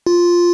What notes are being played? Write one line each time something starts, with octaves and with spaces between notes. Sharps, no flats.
F4